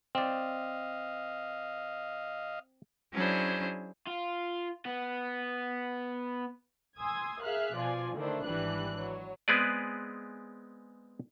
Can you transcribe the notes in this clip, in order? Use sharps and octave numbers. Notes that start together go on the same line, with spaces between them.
C4 D5 D#5 F5
F#3 C#4 D4 E4 G#4 C5
F4
B3
G#5 C6 D#6 E6 G#6
G#4 A#4 E5 F5 F6 F#6
B2 F3 F4 D5 G#5
D3 D#3 A3 D4 E4 C5
G#1 E3 G3 D4 B4 F#6
F#3
G#3 B3 C4 G#4 B4 D5